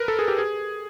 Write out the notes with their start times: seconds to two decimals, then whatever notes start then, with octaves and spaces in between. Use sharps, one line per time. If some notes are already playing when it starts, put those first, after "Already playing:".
Already playing: A#4 B4
0.08 A4
0.19 G#4
0.28 G4
0.38 G#4